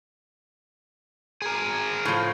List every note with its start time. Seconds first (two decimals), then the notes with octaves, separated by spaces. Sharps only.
1.42 G#4 A#4
2.05 A2 F3